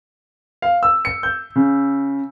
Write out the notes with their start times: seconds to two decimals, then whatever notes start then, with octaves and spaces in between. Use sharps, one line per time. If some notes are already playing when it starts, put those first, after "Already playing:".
0.62 F5
0.83 E6
1.05 C#7
1.23 G6
1.56 C#3